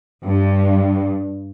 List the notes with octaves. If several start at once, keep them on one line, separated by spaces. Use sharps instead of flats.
G2